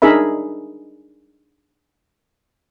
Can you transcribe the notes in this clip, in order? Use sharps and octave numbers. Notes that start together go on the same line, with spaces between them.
D4 D#4 G#4 A#4 E5 B5